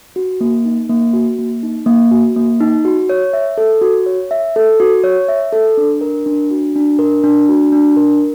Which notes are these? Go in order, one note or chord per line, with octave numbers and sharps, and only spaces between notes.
F#4
A#3
D#4
A#3
F#4
A#3
D#4
A#3
F#4
A#3
D#4
F#4
C#5
E5
A4
F#4
C#5
E5
A4
F#4
C#5
E5
A4
D4
A#4
D4
F#4
D4
A#4
D4
F#4
D4
A#4